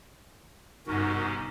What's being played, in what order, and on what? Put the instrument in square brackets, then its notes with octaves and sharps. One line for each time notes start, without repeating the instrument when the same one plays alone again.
[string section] G1 [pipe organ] G#2 C3 C#4 [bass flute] D#4 [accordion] F#4 A#4